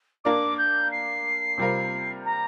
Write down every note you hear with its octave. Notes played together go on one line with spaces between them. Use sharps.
A#3 D4 A#4 D5 D6
G6
C7
C3 G3 C4 F4 A#4
A#5